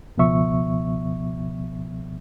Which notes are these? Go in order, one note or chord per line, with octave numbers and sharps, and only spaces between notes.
C#2 B2 F3 B3 E5 C#6